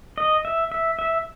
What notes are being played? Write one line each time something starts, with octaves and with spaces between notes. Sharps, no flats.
D#5
E5
E5
E5